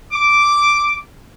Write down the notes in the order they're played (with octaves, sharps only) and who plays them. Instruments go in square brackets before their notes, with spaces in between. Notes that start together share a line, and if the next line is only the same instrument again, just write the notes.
[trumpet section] D6